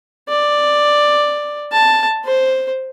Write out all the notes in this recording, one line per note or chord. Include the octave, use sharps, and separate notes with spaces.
D5
A5
C5